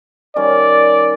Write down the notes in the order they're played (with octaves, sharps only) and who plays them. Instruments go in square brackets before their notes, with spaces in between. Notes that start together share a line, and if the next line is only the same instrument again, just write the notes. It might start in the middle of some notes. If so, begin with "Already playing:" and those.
[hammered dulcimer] D#3 G3 C#4 [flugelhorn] D5